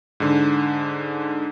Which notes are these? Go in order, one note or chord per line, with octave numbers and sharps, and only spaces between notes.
G#2 D3